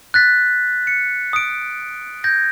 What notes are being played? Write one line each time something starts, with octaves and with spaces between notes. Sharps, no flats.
F#6 A6 B6
C#7
D#6 D7
G6 G#6 A#6